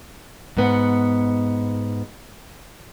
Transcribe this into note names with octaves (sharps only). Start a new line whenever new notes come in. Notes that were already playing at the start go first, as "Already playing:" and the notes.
G#2 B3 F#5